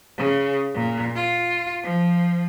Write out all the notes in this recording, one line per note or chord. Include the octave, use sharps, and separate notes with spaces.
C#3
A#2
F4
F3